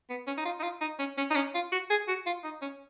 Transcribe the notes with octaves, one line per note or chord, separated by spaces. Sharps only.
B3
C#4
D#4
F4
D#4
F4
D#4
C#4
C#4
D#4
C#4
F4
F#4
G#4
F#4
F4
D#4
C#4